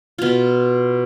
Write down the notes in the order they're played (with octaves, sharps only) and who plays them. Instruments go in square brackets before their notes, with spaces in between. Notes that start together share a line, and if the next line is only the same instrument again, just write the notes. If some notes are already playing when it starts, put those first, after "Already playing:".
[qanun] B2 F4